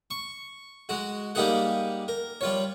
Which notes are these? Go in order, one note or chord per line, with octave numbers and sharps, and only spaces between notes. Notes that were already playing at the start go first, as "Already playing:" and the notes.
C#6
G#3 F#4
G3 A#3 D#4 G4 G#4 F#5
A#4
G3 F4 C#5